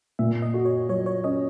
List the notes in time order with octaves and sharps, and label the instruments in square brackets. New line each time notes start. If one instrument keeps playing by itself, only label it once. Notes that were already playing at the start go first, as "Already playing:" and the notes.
[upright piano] A#2 [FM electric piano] E5
[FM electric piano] D#5
[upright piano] F#4
[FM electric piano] C#5
[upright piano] F#3 [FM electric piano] C#5
[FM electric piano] C#5
[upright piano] C#4 [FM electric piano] D#5